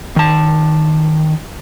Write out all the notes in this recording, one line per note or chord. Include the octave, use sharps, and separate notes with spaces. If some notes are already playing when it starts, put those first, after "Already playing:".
D#3 A5